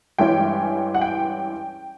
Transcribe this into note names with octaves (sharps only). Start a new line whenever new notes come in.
G2 E3 G#3 C#4 E4 G5
F#5
G5